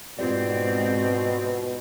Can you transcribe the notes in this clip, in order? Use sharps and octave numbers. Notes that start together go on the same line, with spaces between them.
G#2 B2 C4 F4 G4 D5